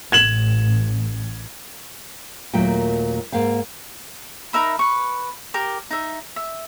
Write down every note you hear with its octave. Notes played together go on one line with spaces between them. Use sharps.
A1 G#6 E7 F#7
D#2 A#2 F#3 A3 G5
G#2 A#3 F5 G5
D#4 A#4 E5 B5
B4 C#6
G4 A#4
D#4 E5
E5